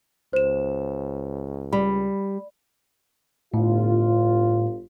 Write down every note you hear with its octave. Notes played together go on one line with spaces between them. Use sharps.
C#2 C5 E7
G3 B5
G1 A2 F4